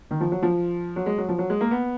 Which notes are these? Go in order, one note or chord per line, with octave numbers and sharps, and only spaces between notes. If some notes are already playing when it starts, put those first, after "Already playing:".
D#3
F3
F#3
F3
F#3
G#3
F#3
F3
F#3
G#3
A#3
B3